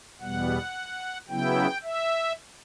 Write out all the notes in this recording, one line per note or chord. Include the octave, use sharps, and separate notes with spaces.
E2 B2 G3 B3 F#5
C#3 F#3 B3 E4 G5
E5